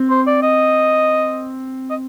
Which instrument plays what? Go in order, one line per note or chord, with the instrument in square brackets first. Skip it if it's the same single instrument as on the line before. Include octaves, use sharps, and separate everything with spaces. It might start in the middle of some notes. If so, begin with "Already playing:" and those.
Already playing: [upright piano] C4
[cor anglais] C5
D5
D#5
D#5